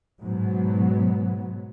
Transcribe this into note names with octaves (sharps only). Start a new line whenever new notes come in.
G#2 B2 F#3 B3